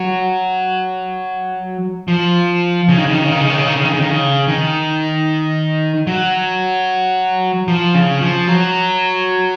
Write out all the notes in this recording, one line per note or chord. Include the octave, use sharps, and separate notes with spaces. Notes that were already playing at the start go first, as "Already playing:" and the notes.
Already playing: F#3
F3
C#3
D#3
C#3
D#3
C#3
D#3
C#3
D#3
C#3
D#3
C#3
D#3
C#3
D#3
C#3
D#3
F#3
F3
C#3
F3
F#3